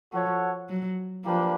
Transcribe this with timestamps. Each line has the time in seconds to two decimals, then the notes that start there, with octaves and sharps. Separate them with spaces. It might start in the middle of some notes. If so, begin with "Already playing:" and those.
0.13 F3 F#4 A4 C#5 F#5
0.70 F#3
1.25 F3 A#3 D4 G4 B4